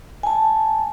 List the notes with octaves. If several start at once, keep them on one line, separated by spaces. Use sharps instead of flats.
G#5 A5